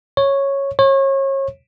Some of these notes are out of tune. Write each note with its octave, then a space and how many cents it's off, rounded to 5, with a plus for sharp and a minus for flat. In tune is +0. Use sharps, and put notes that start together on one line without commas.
C#5 -5
C#5 -30